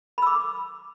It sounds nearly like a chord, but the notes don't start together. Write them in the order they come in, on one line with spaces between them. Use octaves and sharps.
B5 E6 D6